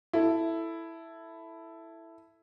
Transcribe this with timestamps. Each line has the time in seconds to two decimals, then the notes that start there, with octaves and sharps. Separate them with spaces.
0.13 E4 A4